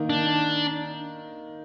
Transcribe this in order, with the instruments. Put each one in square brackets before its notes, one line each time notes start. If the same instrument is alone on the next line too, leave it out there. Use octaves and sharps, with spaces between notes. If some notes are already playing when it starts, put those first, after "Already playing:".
Already playing: [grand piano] D#3 A#3 D#4 A#4
[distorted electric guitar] D4